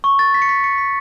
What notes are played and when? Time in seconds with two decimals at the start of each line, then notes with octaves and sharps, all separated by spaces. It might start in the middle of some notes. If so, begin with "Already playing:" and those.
0.04 C#6
0.19 A6
0.34 B6
0.42 C#7
0.49 B6
0.64 C#7
0.78 B6